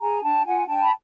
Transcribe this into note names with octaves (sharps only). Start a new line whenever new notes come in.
G#4 G#5 A#5
D4 G5 A5
F4 F#5 G#5
D4 G5 A5
B5